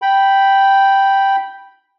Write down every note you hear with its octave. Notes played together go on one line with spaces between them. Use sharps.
G5 B5